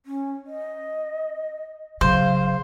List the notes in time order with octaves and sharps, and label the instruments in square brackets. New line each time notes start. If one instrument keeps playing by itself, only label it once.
[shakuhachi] C#4
D#5
[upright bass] C#3 F#3 [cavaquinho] C5 [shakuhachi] F5